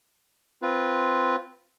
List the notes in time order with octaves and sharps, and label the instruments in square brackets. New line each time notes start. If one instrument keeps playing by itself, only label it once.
[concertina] C4 F4 B4